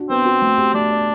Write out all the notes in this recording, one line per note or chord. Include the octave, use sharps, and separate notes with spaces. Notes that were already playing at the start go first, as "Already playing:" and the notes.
Already playing: D4 F#4
B3 C4
F#4
A3
G4
A3 D4
D5